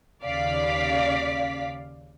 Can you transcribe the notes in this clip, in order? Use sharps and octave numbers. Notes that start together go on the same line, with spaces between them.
D#2 C#3 D5 F5 B6